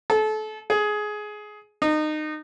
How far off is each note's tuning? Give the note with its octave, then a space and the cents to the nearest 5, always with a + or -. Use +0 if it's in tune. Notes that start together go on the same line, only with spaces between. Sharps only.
A4 -30
G#4 +15
D#4 -25